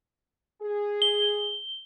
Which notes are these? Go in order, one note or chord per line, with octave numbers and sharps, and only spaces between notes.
G#4
G7